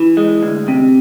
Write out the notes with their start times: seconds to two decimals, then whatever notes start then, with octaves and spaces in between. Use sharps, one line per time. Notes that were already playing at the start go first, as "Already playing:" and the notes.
Already playing: E3
0.17 G#3
0.43 D2
0.68 C3